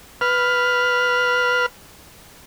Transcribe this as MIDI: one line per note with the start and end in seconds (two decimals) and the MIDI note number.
0.21 1.66 71
0.21 1.66 89